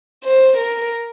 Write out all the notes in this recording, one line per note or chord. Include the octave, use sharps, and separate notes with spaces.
C5
A#4